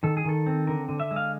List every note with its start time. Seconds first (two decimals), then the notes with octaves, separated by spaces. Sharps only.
0.03 D#3 A4
0.17 G#4
0.25 D#3 A4
0.46 C4
0.67 D3 A#4
0.89 D3
1.00 E5
1.11 G#3
1.16 F5